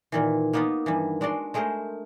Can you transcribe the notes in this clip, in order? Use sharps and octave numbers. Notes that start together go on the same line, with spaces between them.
A#2 D#3 E3
A#3 B3 D#4 F4 B4
G2 D#3 E3
G#3 D4 F#4 D5 C6
G#3 A3 G#4 A#4 C5